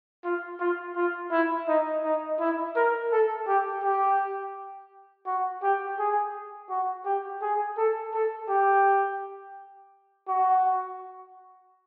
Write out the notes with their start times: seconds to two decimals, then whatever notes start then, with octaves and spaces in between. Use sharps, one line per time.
0.25 F4
0.60 F4
0.96 F4
1.32 E4
1.68 D#4
2.04 D#4
2.40 E4
2.76 A#4
3.12 A4
3.48 G4
3.83 G4
5.26 F#4
5.63 G4
5.99 G#4
6.70 F#4
7.06 G4
7.42 G#4
7.77 A4
8.14 A4
8.49 G4
10.28 F#4